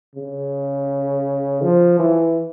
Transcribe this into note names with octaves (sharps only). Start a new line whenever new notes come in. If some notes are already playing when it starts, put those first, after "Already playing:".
C#3
F3
E3